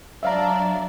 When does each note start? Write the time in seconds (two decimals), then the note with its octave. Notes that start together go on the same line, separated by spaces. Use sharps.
0.23 F#3 D4 D5 E5 F5 A#5